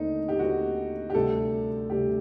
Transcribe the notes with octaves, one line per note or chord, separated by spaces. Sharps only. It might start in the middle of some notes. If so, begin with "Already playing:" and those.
Already playing: D#2 D3 A3 C4 D#4
G4
D#2 D3 A3 C4 F#4
G4
D2 C3 G3 D4 A4
D2 C3 G3 D4 G4